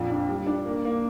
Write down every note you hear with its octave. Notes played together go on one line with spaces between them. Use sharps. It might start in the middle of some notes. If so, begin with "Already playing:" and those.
Already playing: A#1 F2
D4
G3
D4
A#3
A#3